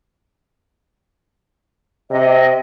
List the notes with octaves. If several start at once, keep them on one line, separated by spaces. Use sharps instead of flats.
C3 D#5